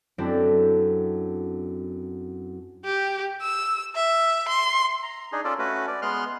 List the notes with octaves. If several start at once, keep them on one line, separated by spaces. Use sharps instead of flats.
F#2 A3 C4 D4 E4
G4
E6
E5
C6
A#5
D4 D#4 G#4
C#4 F4 A4 D5
A3 C#4 F#4 B4
D5
G#3 B3 C6 F6 F#6